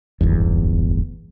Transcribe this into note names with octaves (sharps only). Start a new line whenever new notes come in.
D1 G1 E2